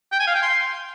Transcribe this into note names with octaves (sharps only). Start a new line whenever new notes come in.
G5
G#5
F5
G5
C6